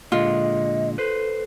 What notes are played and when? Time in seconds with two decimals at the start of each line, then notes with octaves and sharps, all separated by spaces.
0.12 A#2 D3 G#3 F4 D#5
0.98 A4 B4 C5